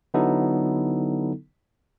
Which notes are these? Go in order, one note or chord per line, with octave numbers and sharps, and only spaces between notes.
D3 F#3 B3 D#4 E4 A4